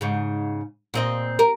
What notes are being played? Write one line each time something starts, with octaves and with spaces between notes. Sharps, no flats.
G#2 C#3
A#2 C4 D#5
A#4